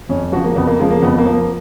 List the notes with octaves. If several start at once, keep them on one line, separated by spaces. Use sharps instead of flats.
F2 C#4
C#3 F3 F#4
A#3
F2 B3
A#3
C#3 F3 G#3
A#3
F2 B3
A#3
F3
A#3